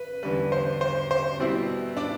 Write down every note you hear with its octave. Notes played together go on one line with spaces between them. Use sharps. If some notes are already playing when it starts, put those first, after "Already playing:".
Already playing: B4
E2 D3 G3 B4
C5
C5
C5
B2 G3 C4 E4
D4 D5